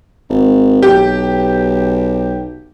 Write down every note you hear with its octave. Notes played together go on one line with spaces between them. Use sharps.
G#1
B1 G4